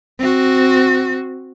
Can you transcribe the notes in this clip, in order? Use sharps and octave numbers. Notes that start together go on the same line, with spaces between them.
C4 F#4